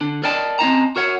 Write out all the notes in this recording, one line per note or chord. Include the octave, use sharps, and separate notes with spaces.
D3 D4
A#4 D5 D#5 G5 A5
C4 C#4 D#4 D#5 A5 A#5
F#4 A#4 C#5 F#5